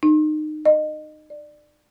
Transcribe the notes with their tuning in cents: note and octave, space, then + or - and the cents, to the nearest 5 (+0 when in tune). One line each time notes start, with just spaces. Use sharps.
D#4 -25
D#5 -25
D5 +15